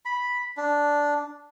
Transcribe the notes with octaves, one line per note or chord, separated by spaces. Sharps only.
B5
D4